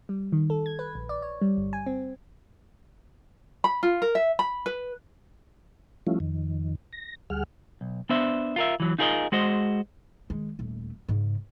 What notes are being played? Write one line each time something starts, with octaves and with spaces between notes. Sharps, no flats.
G3
D#3
A4
G#6
B4
A#1
D5
C#5
G3
G1
G#5
C4
B5
F4
A#4
E5
B5
B4
F3 G3 A3 C#4 E4 F4
F2 D#3
A#6
D2 G3 G#4 F#5 F6
B1
B3 D4 C5 E5
F4 A#4 E5
E3 F#3
D#4 F4 G#4 A#4 C#5 D#5
G#3 F#4 C5 D#5
D#3 G#3
D#1 A3
G#2 C#3